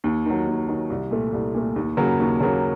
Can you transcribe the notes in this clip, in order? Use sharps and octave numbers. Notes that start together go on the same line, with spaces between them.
D#2
D#3 F#3
D#2
D#3 F#3
C2
A#2 A3
C2
A#2 A3
D#2
C#3 F#3 A#3
D#2
C#3 F#3 A#3